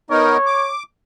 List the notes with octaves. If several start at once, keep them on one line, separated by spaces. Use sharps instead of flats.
B3 D#4 A#4 C#5
D6